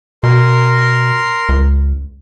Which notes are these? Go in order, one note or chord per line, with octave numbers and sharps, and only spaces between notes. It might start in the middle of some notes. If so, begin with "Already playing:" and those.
B2 A#4 C6
C#2